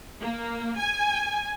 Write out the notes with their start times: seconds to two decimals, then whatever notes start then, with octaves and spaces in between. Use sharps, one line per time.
0.21 A#3
0.77 G#5